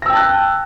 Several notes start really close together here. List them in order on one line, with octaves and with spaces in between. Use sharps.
A#6 E6 G5 A5 F#6